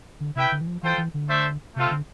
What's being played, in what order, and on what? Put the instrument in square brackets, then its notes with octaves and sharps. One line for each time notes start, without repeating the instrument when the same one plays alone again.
[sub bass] D3
[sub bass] C3 [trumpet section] E4 B4 E5 G5
[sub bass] D3
E3
F3
[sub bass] E3 [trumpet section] F4 A4 C5 G5
[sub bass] E3
D3
[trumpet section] A3 D4 A4 C5 E5
[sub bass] C3 [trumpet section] A3 C4 F4 A4
[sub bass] D3